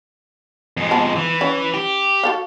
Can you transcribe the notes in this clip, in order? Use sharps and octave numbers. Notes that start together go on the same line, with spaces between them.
F2 G#3
B3 A5
E3
C#4
G4
F#4 A4 F5